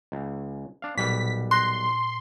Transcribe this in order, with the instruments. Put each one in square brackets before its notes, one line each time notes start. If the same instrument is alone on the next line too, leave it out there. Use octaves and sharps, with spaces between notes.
[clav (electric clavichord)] C#2
D4 F5
[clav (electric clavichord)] B1 G3 F#5 [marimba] A#2 [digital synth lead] B6
[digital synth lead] C6 [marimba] F#6 A#6